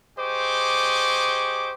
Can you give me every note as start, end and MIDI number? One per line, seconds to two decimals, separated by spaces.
0.18 1.74 67
0.18 1.74 68
0.18 1.74 72
0.18 1.74 75
0.18 1.74 85
0.18 1.74 86